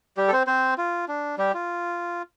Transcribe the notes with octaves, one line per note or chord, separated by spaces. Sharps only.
G3 G4
A4
C4 C5
C4 C5
F4
D4
G3 G4
F4